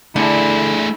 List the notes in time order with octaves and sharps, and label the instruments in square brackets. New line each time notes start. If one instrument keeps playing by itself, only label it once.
[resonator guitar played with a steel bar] D3 [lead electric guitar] A3 G#4 [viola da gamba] E4